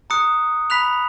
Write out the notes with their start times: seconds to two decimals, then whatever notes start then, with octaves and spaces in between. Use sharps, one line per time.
0.10 A#5 D#6 F#6 C#7
0.70 B5 F#6 B6 F7